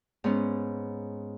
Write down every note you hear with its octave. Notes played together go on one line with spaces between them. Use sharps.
G#2 B3 C#4